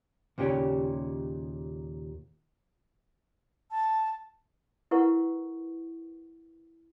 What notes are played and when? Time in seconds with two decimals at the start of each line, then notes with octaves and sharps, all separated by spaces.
0.38 D#2 A#2 C#3 G4 C#5
3.71 A5
4.91 E4 A#4 B4 F#5 C#6